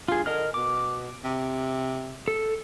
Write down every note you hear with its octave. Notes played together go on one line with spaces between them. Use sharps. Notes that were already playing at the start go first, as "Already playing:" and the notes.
G2 F4 G#4
D3 A#4 D#5 F6
B2 D6
C3
A4